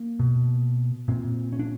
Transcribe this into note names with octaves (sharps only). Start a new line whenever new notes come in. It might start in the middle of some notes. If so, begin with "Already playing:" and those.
Already playing: A#3
B2
A#2 C4
C#4
D4